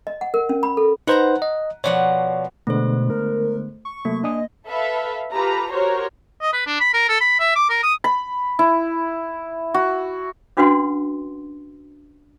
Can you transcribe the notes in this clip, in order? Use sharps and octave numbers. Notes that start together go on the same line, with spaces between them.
D#5
F#5
A#4
C#4
B5
A4
D#4 B4 C5 F#5 A5 A#5
D#5
B2 F3 C#5 D5 F#5
B2 D3 G#3 A3 B3 C5
A#4
C#6
C3 F#3 A3 A#3
D4 D#5 G#5 D#6
A4 B4 E5 F5
F4 G4 A4 B4 A#5
F#4 G4 A#4 C5 C#5
D#5
B4
D4
B5
A#4
A4
B5
E5
D6
A#4
D#6
B5
E4
F#4
C#4 D4 F#4 B4 F#5 C6